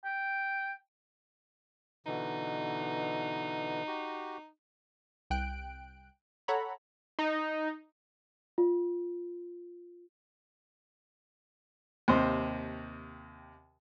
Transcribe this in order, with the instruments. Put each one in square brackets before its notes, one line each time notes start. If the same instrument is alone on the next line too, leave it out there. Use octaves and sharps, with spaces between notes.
[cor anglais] G5
[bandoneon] B2 D3 E3 [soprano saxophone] D#4
[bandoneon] F#4 G4
[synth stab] C2 G5 F#6 D7
A4 C#5 F#5 A#5 B5
[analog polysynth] D#4
[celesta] F4
[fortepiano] D#2 C3 C5